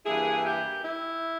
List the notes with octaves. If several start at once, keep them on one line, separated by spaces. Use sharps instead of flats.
G2 E3 A#3 E4 G#4
G4
E4